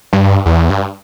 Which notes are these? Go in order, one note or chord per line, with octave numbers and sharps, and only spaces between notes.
G2
E2
G2